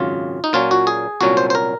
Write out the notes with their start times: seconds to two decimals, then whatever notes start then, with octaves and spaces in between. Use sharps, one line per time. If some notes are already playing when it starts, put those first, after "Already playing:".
Already playing: G#1 F#2 C#3 F4
0.44 D#4
0.53 A#2 F#3 C#4 F4
0.71 F#4
0.87 G#4
1.21 C2 A#2 F#3 C#4 F#4
1.37 C5
1.50 C5
1.55 A#4